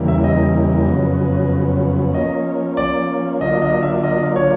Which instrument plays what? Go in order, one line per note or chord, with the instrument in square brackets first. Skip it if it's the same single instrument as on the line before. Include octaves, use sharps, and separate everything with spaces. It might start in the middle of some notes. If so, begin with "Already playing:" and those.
Already playing: [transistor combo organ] E2 C#3 E3 G3 A#3
[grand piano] E5
D#5
[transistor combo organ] F2 C#3 F#3 B3
[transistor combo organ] F3 A#3 C#4 [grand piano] D#5
[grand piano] D5
[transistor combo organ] D3 F#3 A#3 D4 F4 [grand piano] D#5
[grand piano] D#5
E5
D#5
C#5